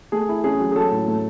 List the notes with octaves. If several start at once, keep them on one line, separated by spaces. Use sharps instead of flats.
A3 G#4
E4
C#4 G#4
F#3
G#4
F#3 A4
A2
A3